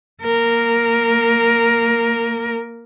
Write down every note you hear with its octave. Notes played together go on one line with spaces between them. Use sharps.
A#3 A#4